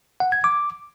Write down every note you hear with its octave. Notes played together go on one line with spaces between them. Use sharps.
F#5
G#6
D6